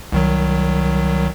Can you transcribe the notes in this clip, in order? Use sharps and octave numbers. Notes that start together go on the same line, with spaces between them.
C2 D#3 F#3